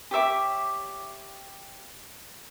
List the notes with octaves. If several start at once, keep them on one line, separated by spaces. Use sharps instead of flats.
G4 C#5 E5 D6